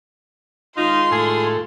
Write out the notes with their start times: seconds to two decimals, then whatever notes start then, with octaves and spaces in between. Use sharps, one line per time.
0.77 D#3 G#3 D#4 F4 C6
1.11 A2 G#4 A4